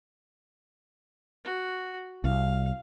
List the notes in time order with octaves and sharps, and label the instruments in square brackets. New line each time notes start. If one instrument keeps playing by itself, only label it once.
[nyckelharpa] F#4
[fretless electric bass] C2 [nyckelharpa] F5